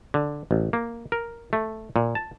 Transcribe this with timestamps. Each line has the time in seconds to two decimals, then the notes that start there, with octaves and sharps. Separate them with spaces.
0.14 D3
0.51 A1
0.73 A#3
1.12 A#4
1.53 A3
1.96 A#2
2.15 A5